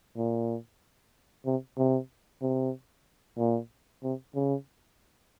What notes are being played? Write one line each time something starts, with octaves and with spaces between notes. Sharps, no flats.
A#2
C3
C3
C3
A#2
C3
C#3